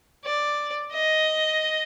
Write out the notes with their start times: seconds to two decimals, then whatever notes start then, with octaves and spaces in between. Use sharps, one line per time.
0.24 D5
0.93 D#5